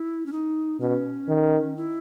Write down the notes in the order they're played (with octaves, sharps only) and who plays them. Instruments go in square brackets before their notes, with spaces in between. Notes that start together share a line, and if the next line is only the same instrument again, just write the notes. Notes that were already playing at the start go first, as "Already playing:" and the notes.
Already playing: [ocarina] E4
C#4
D#4
[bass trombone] B2 [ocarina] C#4
[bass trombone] D#3
[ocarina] E4